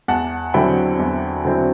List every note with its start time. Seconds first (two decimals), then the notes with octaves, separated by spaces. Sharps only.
0.08 E2 F#5 A5
0.54 D3 F#3 C4 E4 G5 B5
0.99 E2
1.45 D3 F#3 C4 E4